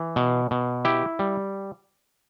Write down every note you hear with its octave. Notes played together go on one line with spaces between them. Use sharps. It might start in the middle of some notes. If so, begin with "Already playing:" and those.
Already playing: E3
B2
B2
E4 G4
G3